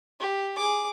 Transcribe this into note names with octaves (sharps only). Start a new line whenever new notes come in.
G4
G#4 D6